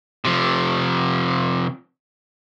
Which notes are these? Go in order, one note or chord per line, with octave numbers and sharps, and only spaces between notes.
C3 F3